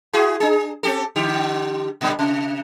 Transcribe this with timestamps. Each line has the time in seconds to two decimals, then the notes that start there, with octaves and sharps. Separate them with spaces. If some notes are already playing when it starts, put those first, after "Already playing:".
0.13 E4 F#4 G#4
0.40 D4 G#4
0.83 C4 G4 A4
1.16 D3 G4
2.01 A#2 D3 G3
2.19 C3